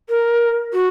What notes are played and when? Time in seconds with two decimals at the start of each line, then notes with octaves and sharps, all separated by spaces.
0.09 A#4
0.73 F#4